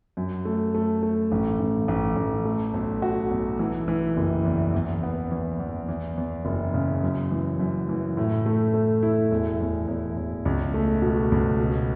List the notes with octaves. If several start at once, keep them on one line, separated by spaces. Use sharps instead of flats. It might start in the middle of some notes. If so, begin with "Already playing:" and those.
F#2
A3
A3
A3
A1
A1
A1
A1
A3
B1
F#4
B1
E3
E3
F#1
E2
E2
B3
E2
E2
E2
E2
F#1
C#3
F#2
E3
F#2
E3
A2
A3
A3
E4
E1
E1
E1
E1
C#2
A3
B2
C#2
B2